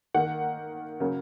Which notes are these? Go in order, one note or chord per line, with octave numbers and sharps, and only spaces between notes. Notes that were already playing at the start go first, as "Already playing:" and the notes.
D#3 A#3 F#5
C#3 F#3 A#3